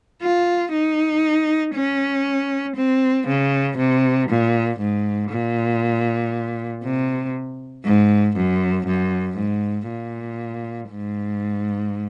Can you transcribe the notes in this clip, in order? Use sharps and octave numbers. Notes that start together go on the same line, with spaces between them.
F4
D#4
C#4
C4
C#3
C3
A#2
G#2
A#2
C3
G#2
F#2
F#2
G#2
A#2
G#2